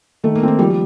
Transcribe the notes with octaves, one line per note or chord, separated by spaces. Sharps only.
D#3 A3
A#3
D#3 C4
A#3
F3 G3
G3